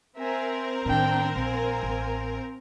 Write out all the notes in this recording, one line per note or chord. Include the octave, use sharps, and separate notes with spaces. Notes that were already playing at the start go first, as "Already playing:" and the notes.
C4 A#4 E5 G#5
A2 D#3 D4 G5
A#1 A#3 G#5
A1